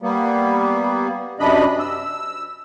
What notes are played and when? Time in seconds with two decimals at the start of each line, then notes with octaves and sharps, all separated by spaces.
0.02 G3 A#3 B3
1.40 F#2 C3 D4 D#5 B5
1.79 E6